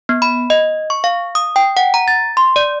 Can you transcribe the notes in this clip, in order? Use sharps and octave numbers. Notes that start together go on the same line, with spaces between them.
B3
B5
D#5
C#6
F5
D#6
G5
F#5
A#5
A6
C6
D5